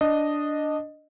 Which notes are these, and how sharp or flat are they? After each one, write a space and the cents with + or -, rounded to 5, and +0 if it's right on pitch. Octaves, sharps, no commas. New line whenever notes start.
D4 +0 D#5 -10